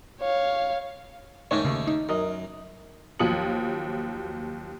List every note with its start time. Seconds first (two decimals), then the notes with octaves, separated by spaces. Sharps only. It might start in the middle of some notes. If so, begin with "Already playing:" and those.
0.21 C#5 F5
1.51 G#2 D#3 A3 C#4 C#5
1.65 D#2 C#3
1.87 D#4
2.09 F#2 A#4 D#5
3.19 D#2 F3 F#3 D#6 C#7 F#7